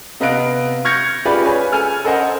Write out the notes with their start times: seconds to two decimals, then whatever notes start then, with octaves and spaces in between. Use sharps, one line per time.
0.20 C3 B3 D#5 F5 F#6 D7
0.85 C#6 F6 G6 G#6 A#6 C#7
1.25 F4 G4 G#4 B4 D5
1.41 G#4 B4 C#5 G#5
1.72 A4 G#5 F6
2.05 A4 A#4 C5 D#5 F#5 G#5